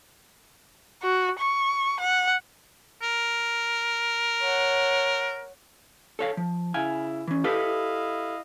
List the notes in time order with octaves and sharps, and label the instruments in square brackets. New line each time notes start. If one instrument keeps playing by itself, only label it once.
[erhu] F#4
C#6
F#5
[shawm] A#4
[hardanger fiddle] C#5 F#5
[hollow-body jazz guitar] A4 C#5 F5
F3
[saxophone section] C#3 E4 [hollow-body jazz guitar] F5 G#5
[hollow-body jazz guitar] E3 C#4
[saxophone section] E4 D#5 F5 [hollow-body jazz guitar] G4 A4 B4